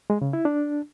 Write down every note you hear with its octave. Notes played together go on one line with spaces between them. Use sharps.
G#3
C#3
E4
D4